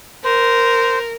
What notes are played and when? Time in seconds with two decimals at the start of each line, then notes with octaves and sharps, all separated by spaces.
0.24 A#4 C5